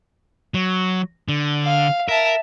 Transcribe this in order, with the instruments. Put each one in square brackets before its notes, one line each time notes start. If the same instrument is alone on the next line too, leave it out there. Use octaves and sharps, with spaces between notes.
[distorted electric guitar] F#3
D3
[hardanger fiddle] F5
[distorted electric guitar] A#4 [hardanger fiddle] E5 A5